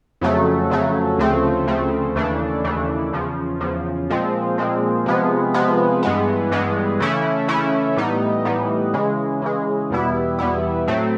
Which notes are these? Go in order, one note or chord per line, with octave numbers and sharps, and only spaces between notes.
F2 C#3 F#3 A3
F2 C#3 F#3 A3
D2 C#3 F3 A3 C4
D2 C#3 F3 A3 C4
D#2 C#3 E3 A3 D4
D#2 C#3 E3 A3 D4
E2 C#3 F3
E2 C#3 F3
A#2 F3 G#3 C4
A#2 F3 G#3 C4
C3 F3 G#3 B3
C3 F3 G#3 B3
G2 E3 G#3 B3
G2 E3 G#3 B3
C#3 E3 A3 C#4 E4
C#3 E3 A3 C#4 E4
A2 E3 G3 B3 D#4
A2 E3 G3 B3 D#4
C#3 E3 G#3
C#3 E3 G#3
E2 B2 G3 B3 E4
E2 B2 G3 B3 E4
A2 F#3 A3 C4